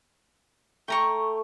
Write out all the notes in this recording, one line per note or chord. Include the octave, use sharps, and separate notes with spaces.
A3 G5 A#5 C#6